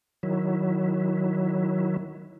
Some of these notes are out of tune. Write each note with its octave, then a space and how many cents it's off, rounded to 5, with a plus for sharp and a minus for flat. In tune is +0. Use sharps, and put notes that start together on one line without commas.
D#3 +0 F#3 +0 E4 +0